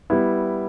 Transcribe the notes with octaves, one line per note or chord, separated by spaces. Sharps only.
G3 B3 E4